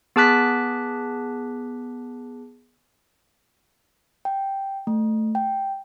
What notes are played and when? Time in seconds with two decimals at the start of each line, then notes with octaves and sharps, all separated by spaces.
0.16 B3 G#4 A5 D6 F#6 B6
4.25 G5
4.87 A3
5.35 G5